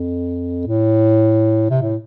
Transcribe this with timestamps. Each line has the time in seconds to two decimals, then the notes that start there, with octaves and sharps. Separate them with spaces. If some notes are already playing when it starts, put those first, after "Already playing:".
Already playing: F2
0.67 A2
1.70 C3
1.82 A2